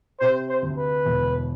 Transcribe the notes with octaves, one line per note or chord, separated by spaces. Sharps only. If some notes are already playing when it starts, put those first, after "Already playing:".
C3 C5
C5
D2
B4
E1